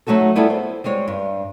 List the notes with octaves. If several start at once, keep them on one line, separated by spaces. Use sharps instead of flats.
F#3 A3 D#4 F#4 A4
G3 B3 E4 F4 G#4 A4
C5
G3 G#3 C4 C#5
G2